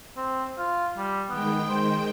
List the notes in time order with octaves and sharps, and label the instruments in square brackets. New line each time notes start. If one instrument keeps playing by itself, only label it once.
[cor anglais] C4
F4
G3
[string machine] D#3 G#3 G5 [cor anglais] B3
[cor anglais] C5